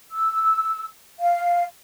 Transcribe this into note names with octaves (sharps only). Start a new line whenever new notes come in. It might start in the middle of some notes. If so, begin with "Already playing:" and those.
E6
F5